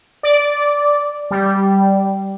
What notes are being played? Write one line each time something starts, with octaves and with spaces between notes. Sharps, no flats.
D5
G3